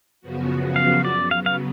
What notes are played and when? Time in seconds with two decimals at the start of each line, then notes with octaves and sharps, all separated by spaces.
0.21 F#2 C#3 F3 B3 F#4
0.76 F5
1.05 D5
1.31 C#3 F#3 B3 F5
1.46 F5